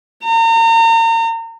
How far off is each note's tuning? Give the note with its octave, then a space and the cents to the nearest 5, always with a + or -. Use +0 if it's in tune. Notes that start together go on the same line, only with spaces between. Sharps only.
A#5 -35